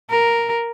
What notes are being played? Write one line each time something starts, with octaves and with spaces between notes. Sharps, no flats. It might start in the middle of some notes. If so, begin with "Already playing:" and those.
A#4